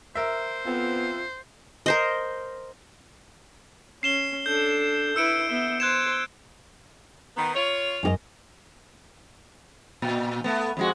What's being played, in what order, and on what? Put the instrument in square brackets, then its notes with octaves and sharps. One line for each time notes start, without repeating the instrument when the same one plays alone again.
[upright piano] A#4 E5 [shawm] C5
[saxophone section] F2 F4 [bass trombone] B3
[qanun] A#4 C5 D#5
[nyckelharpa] C#4 [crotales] C7 E7 G7
[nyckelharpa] D4 A4 [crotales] G6
[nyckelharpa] E4 B4 [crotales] E6 C#7 D7
[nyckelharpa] B3 E5
[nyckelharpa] C5 [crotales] F#6 G#6 E7
[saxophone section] D#3 B3 [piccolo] A#5
[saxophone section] F4 C#5 [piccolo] F7
[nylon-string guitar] F#2 F#4 D#5
[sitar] A#2
A3 B3
F2 G#3 F#4